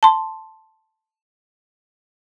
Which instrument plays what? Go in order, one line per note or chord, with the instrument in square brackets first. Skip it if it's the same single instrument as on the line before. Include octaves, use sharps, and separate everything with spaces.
[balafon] A5 C6